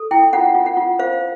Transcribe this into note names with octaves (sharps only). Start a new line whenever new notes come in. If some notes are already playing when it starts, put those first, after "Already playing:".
Already playing: A4
E4 G5
F4 F#5
F4
F#5
F4
C5 F5